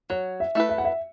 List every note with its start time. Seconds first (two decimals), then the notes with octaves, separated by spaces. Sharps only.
0.10 F#3 C#5
0.40 E5
0.55 A3 E4 B4
0.69 E5
0.78 F#5
0.85 E5